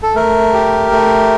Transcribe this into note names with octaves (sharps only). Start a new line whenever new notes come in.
A4
A3 A#4
G4
A3